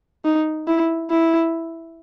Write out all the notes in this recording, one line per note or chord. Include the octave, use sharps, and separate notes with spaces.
D#4
E4
E4